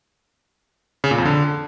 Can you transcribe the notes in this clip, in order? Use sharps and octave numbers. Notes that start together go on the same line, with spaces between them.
C#3
A#2
F2
D3